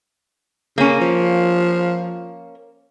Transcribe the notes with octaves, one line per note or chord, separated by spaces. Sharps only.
C#3 A#3 C#4
F3